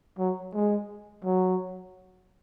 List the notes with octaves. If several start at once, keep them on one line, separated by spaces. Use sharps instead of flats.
F#3
G#3
F#3